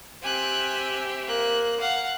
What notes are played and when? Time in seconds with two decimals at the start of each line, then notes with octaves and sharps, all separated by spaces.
0.22 C4 G4 E5 G#5 F#6
1.27 A#3 F#6
1.80 F5 F#5